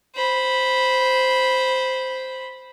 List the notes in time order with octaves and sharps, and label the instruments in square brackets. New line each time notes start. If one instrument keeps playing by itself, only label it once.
[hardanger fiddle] C5 B5